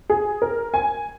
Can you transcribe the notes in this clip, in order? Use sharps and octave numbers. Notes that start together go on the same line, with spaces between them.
G#4
A#4
G#5